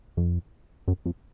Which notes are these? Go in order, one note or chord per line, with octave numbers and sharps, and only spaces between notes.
F2
F#2
F2